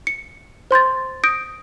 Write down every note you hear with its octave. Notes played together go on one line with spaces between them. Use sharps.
C#7
C5 C6 G6 A6
D#6 G6 A#6 D7